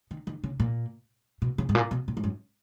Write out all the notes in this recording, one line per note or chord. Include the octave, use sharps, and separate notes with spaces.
D#3
D#3
C#3
A#2
B2
C#3
G#2
A#2
B2
A#2
G#2
F#2